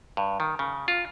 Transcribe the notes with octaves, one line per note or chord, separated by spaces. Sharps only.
G2
D#3
C#3
F4